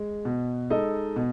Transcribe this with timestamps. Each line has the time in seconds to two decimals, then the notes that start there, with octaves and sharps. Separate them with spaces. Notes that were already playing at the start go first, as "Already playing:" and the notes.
Already playing: G#3
0.25 B2
0.70 G#3 D#4 A4 D#5
1.16 B2